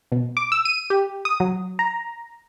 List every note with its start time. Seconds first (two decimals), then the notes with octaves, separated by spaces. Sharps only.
0.12 B2
0.37 D6
0.52 E6
0.65 D#7
0.90 G4
1.25 D#6
1.40 F#3
1.79 A#5